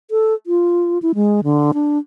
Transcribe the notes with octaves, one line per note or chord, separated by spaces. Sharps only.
A4
F4
E4
G#3
D3
D4